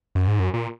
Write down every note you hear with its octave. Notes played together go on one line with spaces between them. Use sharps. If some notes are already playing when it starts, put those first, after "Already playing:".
F#2
G#2
F#2
A#2